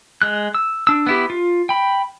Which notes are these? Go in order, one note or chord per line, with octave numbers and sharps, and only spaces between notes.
G#3 F#6
E6
D4 E6
B3 E4 G4
F4
G5 B5